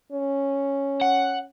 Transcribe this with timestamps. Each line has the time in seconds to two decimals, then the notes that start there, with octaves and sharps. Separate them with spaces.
0.12 C#4
1.01 F#5